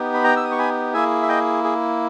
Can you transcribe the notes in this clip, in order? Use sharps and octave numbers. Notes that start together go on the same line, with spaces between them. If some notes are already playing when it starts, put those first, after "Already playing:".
Already playing: B3 D#4 G4
B5
G5 A#5
E6
D#6
C#6
G#5 B5
A#3 E4 G#4 E5 G#5
E5
D#5 G5
G#4